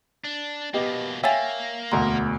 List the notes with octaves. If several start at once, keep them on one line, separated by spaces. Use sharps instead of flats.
D4
B2 A#3 B3 G4 D#5
A#3 C#5 E5 F5 G5 G#5 A6
E1 D2 A#5 C6